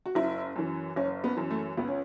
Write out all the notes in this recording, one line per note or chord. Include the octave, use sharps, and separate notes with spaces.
F#4
F#1 E4
F#2 E3
F#1 C#4
B3
F#2 E3
A3
C#2 B3
C#4